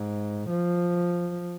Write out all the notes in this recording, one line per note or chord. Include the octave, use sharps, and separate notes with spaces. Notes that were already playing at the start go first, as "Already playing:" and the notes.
Already playing: G#2
F3